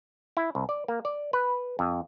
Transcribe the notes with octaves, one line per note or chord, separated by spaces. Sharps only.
E4
C2
D5
A#3
D5
B4
F2